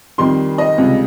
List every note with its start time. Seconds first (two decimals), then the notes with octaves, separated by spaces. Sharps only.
0.18 F2 D#3 G3 C6
0.58 D#5
0.78 C#2 C3 G3